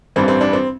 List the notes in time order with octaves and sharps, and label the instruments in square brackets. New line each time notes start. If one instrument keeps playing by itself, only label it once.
[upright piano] A1 G2 E3 G3 C4
C4
D4
C4